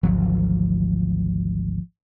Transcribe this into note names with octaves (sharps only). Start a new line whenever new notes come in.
G#1 D2 F3 F#3 A3